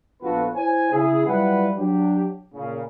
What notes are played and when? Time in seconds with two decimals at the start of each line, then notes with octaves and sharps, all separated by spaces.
0.22 A#1 B3 F4 F#4 A4 B4
0.55 E4 C5 C#5 G#5
0.91 C#3 E4 G#4
1.25 F#3 G3 E4 F4 B4 F#5
1.77 F#3 D4 G4
2.53 A#2 C#3